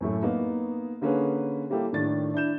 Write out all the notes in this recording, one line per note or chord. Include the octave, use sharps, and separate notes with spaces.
F#2 A2 A3
A#3 B3 D#4
D3 A#3 C#4 G#4 B4
G3 A#3 E4 G4 A4
A2 D#3 D4 A6
D4 E4 G6 E7